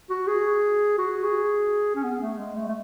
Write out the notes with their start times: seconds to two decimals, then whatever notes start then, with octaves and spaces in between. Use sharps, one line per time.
0.10 F#4
0.27 G#4
0.98 F#4
1.24 G#4
1.95 C#4
2.03 B3
2.21 A3
2.38 G#3
2.56 A3
2.68 A3